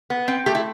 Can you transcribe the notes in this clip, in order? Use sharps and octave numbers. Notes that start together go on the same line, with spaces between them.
B3
C4 G5
A3 G4
E4